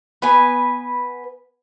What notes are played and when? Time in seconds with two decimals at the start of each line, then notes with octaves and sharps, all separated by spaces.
0.22 B3 B4 G#5